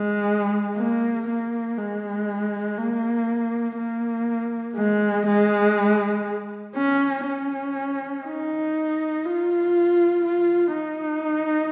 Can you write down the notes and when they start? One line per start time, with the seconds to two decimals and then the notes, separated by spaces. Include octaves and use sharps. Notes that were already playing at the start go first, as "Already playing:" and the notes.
Already playing: G#3
0.77 A#3
1.28 A#3
1.77 G#3
2.77 A#3
3.77 A#3
4.76 G#3
5.27 G#3
6.76 C#4
7.26 C#4
8.25 D#4
9.25 F4
10.25 F4
10.75 D#4